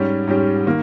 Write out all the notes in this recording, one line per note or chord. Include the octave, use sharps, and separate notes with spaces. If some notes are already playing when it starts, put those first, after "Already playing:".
Already playing: G#2 G3 C#4 G4
G#2 G3 C#4 G4
D#3 A#3